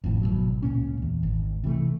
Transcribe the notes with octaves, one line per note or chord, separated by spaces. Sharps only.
G#1 F2 A2
G#1 D#2 B2 F#3
C#2 A#2 A#3 C#4
E2
G#1
C3 E3 F#3 A3